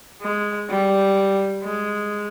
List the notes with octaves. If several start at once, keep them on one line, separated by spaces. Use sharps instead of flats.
G#3
G3
G#3